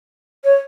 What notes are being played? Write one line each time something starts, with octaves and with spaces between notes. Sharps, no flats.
C#5